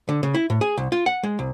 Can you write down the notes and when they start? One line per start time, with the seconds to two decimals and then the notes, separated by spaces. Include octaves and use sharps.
0.09 D3
0.23 C#3
0.34 E4
0.50 A2
0.61 G#4
0.77 C2
0.92 F4
1.06 F#5
1.23 G#3
1.39 C2